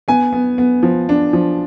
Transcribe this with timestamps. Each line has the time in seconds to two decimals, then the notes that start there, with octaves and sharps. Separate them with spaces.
0.08 B3 G#5
0.33 B3
0.58 B3
0.83 F3
1.09 D4
1.33 F3